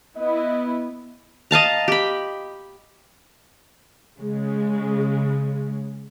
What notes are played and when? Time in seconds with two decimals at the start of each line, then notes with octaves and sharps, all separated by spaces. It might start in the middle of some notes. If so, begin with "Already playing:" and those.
0.16 B3 E4 D#5
1.51 D#5 F5 A5 A#5
1.88 G4 B5
4.18 C#3 G#3